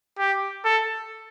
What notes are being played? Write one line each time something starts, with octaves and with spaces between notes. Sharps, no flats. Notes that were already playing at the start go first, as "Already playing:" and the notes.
G4
A4